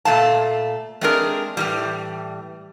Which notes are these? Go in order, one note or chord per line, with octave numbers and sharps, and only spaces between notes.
A#2 A3 F5 A5
G#3 A3 C4 D4 G#4 A#4
A2 E3 G3